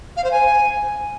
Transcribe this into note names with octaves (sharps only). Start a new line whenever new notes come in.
F5
C5
G#5